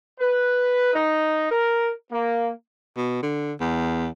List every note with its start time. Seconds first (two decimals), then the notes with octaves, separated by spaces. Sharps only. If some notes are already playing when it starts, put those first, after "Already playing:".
0.20 B4
0.93 D#4
1.49 A#4
2.12 A#3
2.97 B2
3.22 D3
3.60 E2